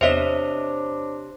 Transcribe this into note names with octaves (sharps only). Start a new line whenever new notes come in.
E2 C3 D4 C5 C#5 D#5 E5 E7